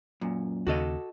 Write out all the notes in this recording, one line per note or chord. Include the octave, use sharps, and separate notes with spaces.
F#2 A#2
D#2 C#3 F#4 A4 D#5